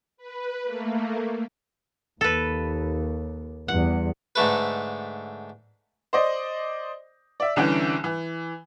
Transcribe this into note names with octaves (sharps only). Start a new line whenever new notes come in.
B4
A3 A#3
D#2 A4 B4
E2 G3 F#5
G#2 D3 A3 B4
C5 D5 D#5
D5 E5
C2 D3 E3 C#4 G5
E3